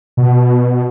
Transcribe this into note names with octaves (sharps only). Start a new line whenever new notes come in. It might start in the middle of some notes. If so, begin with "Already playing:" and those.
B2